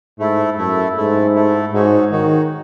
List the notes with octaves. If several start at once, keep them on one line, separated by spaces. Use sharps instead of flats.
G#2 A3 E4 A4
F#2 A3 E4 A4
G#2 A3 E4 A4
A3 E4 A4
G#2 D#4 F#4 C#5
D#3 D#4 F#4 C#5